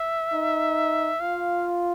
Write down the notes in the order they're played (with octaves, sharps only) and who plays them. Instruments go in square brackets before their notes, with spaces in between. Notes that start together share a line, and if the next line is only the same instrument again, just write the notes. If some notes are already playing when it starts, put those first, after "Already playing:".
Already playing: [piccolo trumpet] E5
[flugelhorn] D#4
[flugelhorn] F4 [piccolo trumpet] F5